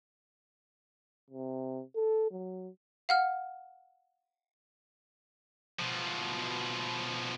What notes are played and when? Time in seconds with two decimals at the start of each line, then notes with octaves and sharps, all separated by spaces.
1.31 C3
1.96 A4
2.31 F#3
3.09 F5 F#5 F6
5.79 B2 F3